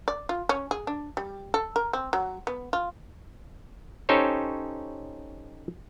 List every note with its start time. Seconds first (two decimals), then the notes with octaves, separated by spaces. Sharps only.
0.08 D5
0.29 F4
0.49 C#4
0.71 G#4
0.87 D4
1.17 G3
1.54 A4
1.76 A#4
1.93 C4
2.13 F#3
2.47 B3
2.73 F4
4.09 C#4 D#4 G4 A4 C5 C#5